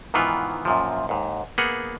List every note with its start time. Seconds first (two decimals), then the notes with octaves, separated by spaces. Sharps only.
0.14 G#2 D#3 E3 B3 F4
0.65 F#2 A#2 F3
1.09 D#2 G#2
1.58 A#3 B3 G#4 F#5